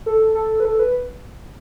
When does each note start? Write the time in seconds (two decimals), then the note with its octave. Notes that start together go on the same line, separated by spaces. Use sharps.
0.06 A4
0.35 A4
0.60 B4
0.65 A4
0.79 B4